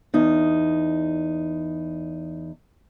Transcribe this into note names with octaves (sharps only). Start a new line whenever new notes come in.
E2 D#4